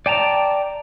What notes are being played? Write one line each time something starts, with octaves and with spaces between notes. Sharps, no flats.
D5 G5 A5 A#5